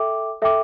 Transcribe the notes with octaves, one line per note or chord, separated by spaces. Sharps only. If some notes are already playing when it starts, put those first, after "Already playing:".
Already playing: A4 E5 G5 D6
A4 E5 G5 D6